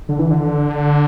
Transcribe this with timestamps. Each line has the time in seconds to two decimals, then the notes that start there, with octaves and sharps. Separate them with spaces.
0.09 D3
0.19 E3
0.30 D3